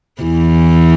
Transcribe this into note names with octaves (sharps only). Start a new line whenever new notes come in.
E2 E3